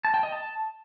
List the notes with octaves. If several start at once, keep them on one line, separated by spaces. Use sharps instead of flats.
A5
G5
D#5
A5